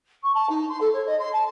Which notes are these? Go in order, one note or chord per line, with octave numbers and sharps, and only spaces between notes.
C#6
A5
D#4
C6
A4
C#5
D#5
C6
A5